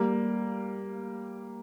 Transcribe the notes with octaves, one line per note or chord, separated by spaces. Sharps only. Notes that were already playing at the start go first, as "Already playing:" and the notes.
Already playing: G3 A#3